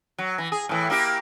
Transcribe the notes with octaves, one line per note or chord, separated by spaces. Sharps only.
F#3
E3
G#4
A2 E3
A#3 E4 G4